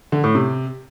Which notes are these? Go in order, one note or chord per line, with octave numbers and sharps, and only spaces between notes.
D3
A2
C3